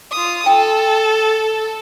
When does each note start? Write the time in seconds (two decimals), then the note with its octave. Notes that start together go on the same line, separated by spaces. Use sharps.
0.12 F4 D#6
0.46 A4 G5